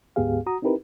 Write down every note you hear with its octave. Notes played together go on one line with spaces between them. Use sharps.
D2 G#2 B3 G4 G#4 F5
F#4 A#5 D#6
C4 D#4 E4 G4 A#4 B4